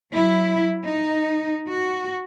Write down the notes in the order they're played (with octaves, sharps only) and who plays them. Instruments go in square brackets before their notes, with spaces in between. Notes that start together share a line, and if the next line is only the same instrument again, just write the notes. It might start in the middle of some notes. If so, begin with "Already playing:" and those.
[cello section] F#3 E4
D#4
F#4